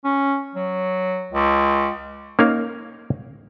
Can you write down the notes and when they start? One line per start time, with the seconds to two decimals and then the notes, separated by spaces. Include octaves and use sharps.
0.04 C#4
0.55 F#3
1.32 C#2
2.39 A#3 C#4 D#4 A#4 F5